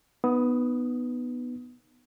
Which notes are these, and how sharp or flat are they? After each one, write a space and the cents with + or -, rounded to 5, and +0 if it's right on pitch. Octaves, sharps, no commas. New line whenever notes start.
B3 +0 D#4 -20 D#6 +15